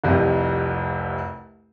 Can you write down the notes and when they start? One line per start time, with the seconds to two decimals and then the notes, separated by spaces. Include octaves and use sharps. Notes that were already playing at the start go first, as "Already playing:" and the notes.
0.04 F1 C2 F2 C3